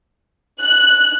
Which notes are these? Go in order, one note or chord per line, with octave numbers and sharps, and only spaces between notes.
F#6